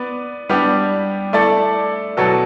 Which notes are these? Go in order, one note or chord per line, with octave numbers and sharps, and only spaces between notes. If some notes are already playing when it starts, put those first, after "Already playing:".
Already playing: B3 B4 D5
G3 B3 D4 G4
A3 E4 A4 D5
B2 F#3 B3 F#4 A4